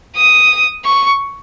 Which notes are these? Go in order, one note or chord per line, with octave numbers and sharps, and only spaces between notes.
D#6
C#6